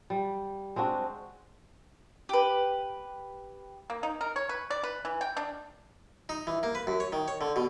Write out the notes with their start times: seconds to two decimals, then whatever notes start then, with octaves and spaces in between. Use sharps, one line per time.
0.10 G3
0.76 G#3 C4 D4 F#4
2.29 G4 B4
3.90 A#3
4.03 D#4
4.21 A#4
4.36 C#5
4.49 B4
4.70 D5
4.83 B4
5.05 E3
5.21 G5
5.37 D4
6.29 D#4
6.47 E3
6.63 A#3
6.75 B4
6.87 F#2
7.00 C#5
7.12 D#3
7.28 C#5
7.41 D3
7.56 B2